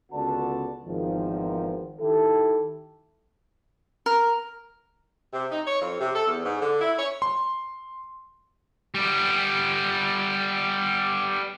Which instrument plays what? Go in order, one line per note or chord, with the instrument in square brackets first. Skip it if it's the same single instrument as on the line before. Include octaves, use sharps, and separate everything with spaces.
[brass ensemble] C#2 D3 B3 F#4 D5 A5
G#1 E2 D#3 F3
D#3 E4 G4 A4
[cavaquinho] A#4
[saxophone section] C3
D#4
C#5
F2
C3
A4
E2
G#2
D3
E4
C#5
[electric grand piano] C6
[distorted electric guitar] G3 B3